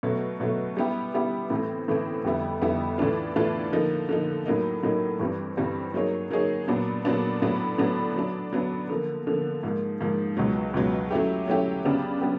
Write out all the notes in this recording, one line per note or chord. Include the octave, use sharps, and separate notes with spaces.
B2 F#3 A3
B2 F#3 A3
G3 B3 E4 G4
G3 B3 E4 G4
A2 E3 A3 C4
A2 E3 A3 C4
F2 D3 G3 B3 E4
F2 D3 G3 B3 E4
A2 E3 A3 D4 F4
A2 E3 A3 D4 F4
D3 F3 A#3 D#4
D3 F3 A#3 D#4
A2 F#3 A#3 D#4
A2 F#3 A#3 D#4
G2 E3 G3 C4
G2 E3 G3 C4
F#3 A#3 D#4 G#4 C#5
F#3 A#3 D#4 G#4 C#5
A#2 F#3 B3 D4
A#2 F#3 B3 D4
A2 F#3 B3 D4
A2 F#3 B3 D4
F#3 B3 D4
F#3 B3 D4
D3 F3 A#3
D3 F3 A#3
G#2 F3 A#3
G#2 F3 A#3
C#2 B2 F#3
C#2 B2 F#3
F#3 A3 C#4 E4 G4
F#3 A3 C#4 E4 G4
C#3 F#3 B3 D4 G4
F#3 B3 D4 G4